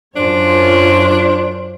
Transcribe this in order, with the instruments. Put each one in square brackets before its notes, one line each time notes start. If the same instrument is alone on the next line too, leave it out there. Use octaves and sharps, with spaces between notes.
[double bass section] F#2 [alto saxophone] D4 [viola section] F4 C#5 [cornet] C5